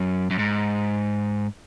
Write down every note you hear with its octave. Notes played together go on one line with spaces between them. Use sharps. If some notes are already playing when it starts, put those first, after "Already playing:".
Already playing: F#2
F#2
G#2